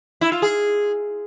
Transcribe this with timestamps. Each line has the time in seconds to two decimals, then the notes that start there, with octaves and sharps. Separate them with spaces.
0.21 E4
0.32 F4
0.42 G#4